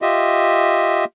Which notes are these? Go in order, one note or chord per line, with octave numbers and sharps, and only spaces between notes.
F4 G4 D#5 E5